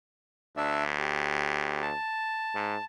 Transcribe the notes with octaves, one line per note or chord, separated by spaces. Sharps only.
D2 D4 D5 E5
G4
A5
G#2